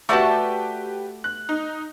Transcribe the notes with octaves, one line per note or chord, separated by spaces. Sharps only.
A3 F#4 G4 B4 D5 F#5 A5 D6
F#6
D#4